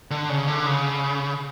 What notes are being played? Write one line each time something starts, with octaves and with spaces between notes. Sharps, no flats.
D3
C#3
D3
C#3